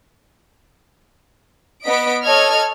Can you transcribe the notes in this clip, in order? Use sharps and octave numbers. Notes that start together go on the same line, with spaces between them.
B3 D#5 B6 D7
A4 C#5 D#5 F6 G#6